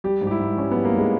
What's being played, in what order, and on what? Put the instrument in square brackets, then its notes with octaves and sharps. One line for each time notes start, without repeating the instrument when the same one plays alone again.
[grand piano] G3 G4
G#2
G4
E4
G#2
G3 C#4
B3
G3
A#3
G#2 G#3